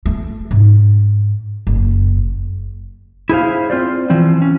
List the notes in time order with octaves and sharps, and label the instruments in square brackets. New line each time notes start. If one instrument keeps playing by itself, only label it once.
[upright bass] A3
G#2
F#1
[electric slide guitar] E4 G#4 C5 F5
C4 F4 C5 D5
E3 F3 C4
C#4